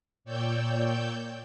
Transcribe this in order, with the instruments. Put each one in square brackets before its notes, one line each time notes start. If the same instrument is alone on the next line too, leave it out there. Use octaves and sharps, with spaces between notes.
[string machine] A#2 C#5 D5 G5 E6 G6